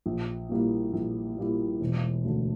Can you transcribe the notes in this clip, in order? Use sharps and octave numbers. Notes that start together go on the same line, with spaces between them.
A#1
A#2 G3 A#3 E4
A#1
A#2 G3 A#3 E4
E1
D2 D3